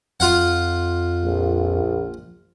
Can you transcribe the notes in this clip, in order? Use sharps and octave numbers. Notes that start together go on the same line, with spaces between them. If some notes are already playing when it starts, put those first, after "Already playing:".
F2 F4 F5 F#5
A#1